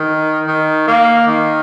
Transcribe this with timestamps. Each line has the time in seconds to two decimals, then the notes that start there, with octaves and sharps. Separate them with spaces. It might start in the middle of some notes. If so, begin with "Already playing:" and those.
Already playing: D#3
0.47 D#3
0.87 A#3
1.27 D#3